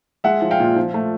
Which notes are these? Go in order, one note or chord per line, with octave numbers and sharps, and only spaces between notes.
G#3 E5 F#5
F3
F5 G5
A#2
F3
A3